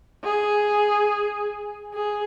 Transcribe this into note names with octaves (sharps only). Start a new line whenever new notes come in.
G#4
G#4